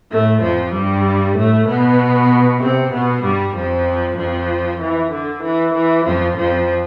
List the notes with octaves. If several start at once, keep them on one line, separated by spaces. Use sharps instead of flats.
A2 A3
F2 F3
G2 G3
A2 A3
B2 B3
C3 C4
B2 B3
G2 G3
F2 F3
F2 F3
E3
D3
E3
E3
F2 F3
F2 F3